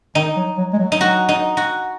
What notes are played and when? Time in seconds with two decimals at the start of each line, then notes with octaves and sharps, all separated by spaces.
0.15 D#3 D#4
0.36 F#3
0.57 F#3
0.73 G#3
0.79 F#3
0.92 D#4
1.01 F#4
1.29 D#4
1.57 F#4